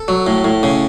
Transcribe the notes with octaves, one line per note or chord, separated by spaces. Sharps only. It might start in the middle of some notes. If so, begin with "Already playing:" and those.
Already playing: A4
F#3
A2
A2
C#3